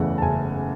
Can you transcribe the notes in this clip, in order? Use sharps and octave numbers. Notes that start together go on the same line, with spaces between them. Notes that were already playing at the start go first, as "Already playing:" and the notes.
Already playing: F#1 E2 C#3 E3 A3 F#5
A5
F#1 G#5